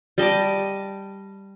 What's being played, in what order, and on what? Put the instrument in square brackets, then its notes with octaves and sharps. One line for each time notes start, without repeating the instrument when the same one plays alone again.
[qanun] G3 D#5 A5 D6